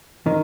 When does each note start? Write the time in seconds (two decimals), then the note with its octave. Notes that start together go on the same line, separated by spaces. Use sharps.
0.26 D#3